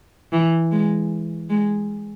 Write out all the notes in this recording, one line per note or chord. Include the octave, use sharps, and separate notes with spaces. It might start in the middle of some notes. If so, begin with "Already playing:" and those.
E3
G#3
G#3